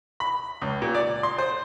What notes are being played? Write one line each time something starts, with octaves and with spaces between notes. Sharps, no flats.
B5
C#2
A#2
D5
C6
C5